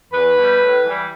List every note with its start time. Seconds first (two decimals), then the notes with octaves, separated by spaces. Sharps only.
0.12 E2 B4
0.36 B2 G3
0.61 A2
0.85 E3 G3